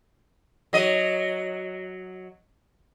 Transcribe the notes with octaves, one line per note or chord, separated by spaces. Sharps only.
F#3 D#5